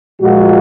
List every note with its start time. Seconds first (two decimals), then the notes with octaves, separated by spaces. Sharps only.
0.21 A#2 F3 G#3 F#4